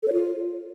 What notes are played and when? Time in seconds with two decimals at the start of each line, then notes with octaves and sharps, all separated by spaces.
0.03 A4
0.08 C#5
0.13 F4